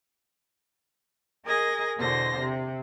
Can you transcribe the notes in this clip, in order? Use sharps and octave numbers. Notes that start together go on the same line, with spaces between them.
G#4 A#4 D#5 G#6 A#6
E2 B2 D3 C5 A#6
C3